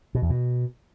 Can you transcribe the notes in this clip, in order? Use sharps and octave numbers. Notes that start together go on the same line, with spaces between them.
B2
E2
B2